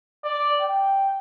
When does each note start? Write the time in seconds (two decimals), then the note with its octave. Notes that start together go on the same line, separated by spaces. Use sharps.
0.24 D5
0.60 G5